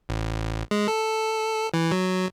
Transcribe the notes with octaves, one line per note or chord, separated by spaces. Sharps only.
A1
G#3
A4
E3
F#3